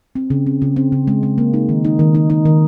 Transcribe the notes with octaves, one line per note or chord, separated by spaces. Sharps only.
C4
C#3
C4
C#3
C4
C#3
G#3
G#3
A#3
D#4
D#3
D#4
D#3
D#4
D#4
D#3